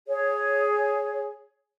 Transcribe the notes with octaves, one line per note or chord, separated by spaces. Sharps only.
G#4 C#5